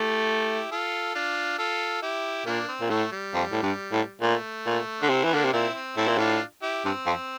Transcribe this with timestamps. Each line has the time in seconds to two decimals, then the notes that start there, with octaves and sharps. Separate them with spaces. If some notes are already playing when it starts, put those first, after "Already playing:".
Already playing: A3 E4 G4
0.71 F4 A4
1.14 D4 F4
1.58 F4 A4
2.02 E4 G4
2.46 A#2 A#3 D4
2.68 C4
2.81 A#2
2.90 A2 A3
3.12 G3
3.34 F2
3.52 A2
3.63 G2
3.92 A2
4.21 A#2 A3
4.66 A#2
5.00 D3 D4
5.09 C3 C4 E4
5.24 E3
5.32 D3 A#3 D4
5.44 C3
5.53 A#2 C4 E4
5.75 C4
5.96 A2 C4 E4
6.08 A#2
6.18 A2 D4 F4
6.62 E4 G4
6.85 G2 C4
7.06 F2